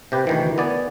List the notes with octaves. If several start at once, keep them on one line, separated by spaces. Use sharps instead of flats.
C3 G4 B4
D2 D#3 E3
B3 D5 G#5